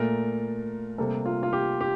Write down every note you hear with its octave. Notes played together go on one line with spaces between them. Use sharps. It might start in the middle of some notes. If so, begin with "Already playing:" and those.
Already playing: A#2 A3 A#4
C3 G3 A#3 A4
F4
F4
G4
G4